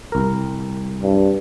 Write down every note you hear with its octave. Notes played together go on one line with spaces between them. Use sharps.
C2 A#4
G2